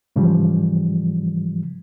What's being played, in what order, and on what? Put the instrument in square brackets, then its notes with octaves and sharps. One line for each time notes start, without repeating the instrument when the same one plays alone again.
[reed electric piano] G#2 C#3 E3 F3 G3